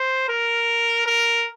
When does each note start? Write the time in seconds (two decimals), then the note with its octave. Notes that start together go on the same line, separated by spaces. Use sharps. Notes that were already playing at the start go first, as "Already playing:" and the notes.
Already playing: C5
0.29 A#4
1.07 A#4